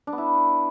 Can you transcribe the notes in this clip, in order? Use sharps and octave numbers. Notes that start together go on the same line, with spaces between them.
D4
B3
E4